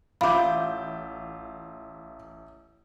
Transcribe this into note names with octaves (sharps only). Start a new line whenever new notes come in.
A1 F4 E5 B5 D6 G6